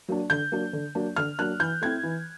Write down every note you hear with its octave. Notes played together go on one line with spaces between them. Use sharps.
F#3 A#3 D4
D3 G6
F#3 A#3 D4
D3
F#3 A#3 D4
D3 F6
F#3 A#3 D4 F#6
E3 G6
A3 C4 E4 G#6
E3